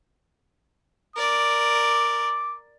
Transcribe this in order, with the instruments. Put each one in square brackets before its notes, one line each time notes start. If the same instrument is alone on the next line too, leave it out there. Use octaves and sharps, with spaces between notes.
[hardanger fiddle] A#4 D5 [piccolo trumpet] D6